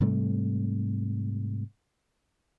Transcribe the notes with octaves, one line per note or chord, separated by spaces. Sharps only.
G#2 C3 G3 A3